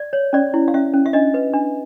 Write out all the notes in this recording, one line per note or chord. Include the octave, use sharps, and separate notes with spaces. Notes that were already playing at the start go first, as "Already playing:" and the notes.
Already playing: D5
C#5
C#4 D5
E4
F5
C#4 E5
C#4
E5
D4 D#5
B4
D4